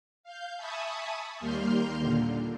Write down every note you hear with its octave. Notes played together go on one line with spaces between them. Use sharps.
F5 G6
E5 G#5 A5 B5 C#6 D#6
D#2 G3 A#3 C6 F6 G6
A#2 D3